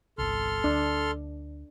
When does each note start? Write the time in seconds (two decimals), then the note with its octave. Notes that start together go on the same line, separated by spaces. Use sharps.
0.18 G1 C2 A4 C6 F6
0.64 D2 D4